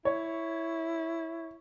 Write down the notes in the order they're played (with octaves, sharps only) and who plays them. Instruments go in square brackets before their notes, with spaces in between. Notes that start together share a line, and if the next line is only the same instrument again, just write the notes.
[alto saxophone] E4 [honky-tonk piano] C#5